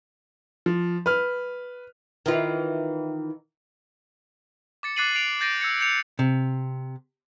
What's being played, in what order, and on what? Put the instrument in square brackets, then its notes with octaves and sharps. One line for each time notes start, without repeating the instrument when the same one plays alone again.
[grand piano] F3
B4 F6
[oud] D#3 E3 F4
[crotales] D6 A6 C#7
D6 F#6 A6 C7 D#7 F#7
C7 D7 F7
G6 A6 A#6 D7 D#7
E6 G#6 C#7
G6 C#7 F7
[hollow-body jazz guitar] C3